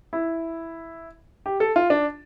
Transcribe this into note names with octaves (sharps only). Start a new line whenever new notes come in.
E4
G4
A4
F4
D4